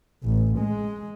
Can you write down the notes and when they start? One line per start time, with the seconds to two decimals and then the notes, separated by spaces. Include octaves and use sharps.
0.25 A1
0.59 G#3